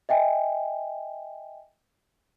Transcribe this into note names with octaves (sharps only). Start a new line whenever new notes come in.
D#5 E5 G5 G#5